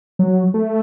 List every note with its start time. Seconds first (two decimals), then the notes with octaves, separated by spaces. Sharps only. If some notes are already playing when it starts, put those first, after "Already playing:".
0.19 F#3
0.54 A3